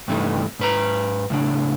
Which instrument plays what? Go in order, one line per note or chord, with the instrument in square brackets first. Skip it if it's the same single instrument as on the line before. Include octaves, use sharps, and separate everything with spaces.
[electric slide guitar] G2 C3 E3 A3 D#4
G#2 B4 A#5
A2 C#3 D4